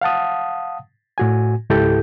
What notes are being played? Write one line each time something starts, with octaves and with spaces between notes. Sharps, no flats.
F5 F#5 A5 D#6
A2 F#4 G#5
C#2 G#2 E4 G4 A4 G6